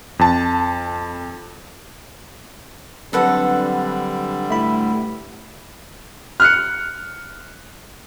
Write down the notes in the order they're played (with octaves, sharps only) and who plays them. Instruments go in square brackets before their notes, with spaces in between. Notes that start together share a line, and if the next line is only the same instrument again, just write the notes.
[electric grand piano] F2 A5
[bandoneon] D3 G3 [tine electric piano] F#3 [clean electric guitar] C4 D4 [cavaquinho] A4 B4 F#5
[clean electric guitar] A2 E4 E5 [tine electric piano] A3 B5
[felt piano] F6 F#6 C#7